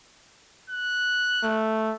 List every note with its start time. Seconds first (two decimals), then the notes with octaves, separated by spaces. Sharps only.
0.70 F#6
1.43 A3